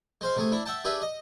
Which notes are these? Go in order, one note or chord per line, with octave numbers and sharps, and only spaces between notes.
G#3 C5 F5
C3 A3 G#4
D4 E4
E5 F#5 G5 A5
D4 G4 G#4 B4 E5
D#5